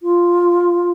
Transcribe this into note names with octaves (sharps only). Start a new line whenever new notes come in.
F4